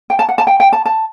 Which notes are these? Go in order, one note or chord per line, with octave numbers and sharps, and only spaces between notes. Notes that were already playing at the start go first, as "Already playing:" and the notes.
G5
A5
F#5
A5
G5
G5
A5
A5